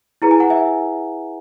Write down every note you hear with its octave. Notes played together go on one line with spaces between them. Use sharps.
E4 G#4 B4 A#5
G#5
F#5
E5 G#5